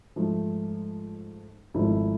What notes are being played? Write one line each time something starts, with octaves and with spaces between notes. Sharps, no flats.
G#2 F3 A3
G#1 G#2 F3 A3 E4